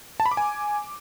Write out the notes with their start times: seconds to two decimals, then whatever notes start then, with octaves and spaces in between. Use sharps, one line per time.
0.20 A5
0.26 B5
0.31 D6
0.37 G#5